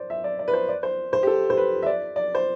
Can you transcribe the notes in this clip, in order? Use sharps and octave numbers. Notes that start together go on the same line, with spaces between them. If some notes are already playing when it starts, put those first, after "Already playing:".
Already playing: C5 D5
E5
D5
D5
B4
C5
D5
C5
C5
G4
A4
C5
B4
E5
D5
D5
C5